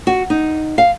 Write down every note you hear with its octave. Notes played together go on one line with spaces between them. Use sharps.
F#4
D#4
F5